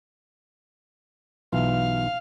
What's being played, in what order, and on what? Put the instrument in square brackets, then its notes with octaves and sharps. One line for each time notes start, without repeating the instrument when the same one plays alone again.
[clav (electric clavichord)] B1 E3 F4 [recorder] F5